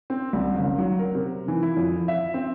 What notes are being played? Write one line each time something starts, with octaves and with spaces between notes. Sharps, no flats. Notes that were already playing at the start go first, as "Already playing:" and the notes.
C4
C2
F#1
F#3
A#4
C3
E3
E4
F2
E5
C4